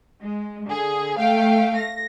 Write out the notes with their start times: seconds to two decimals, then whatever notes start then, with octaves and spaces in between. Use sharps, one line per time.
0.21 G#3
0.67 D3 G#4
1.18 A3 F5 G5
1.77 A#6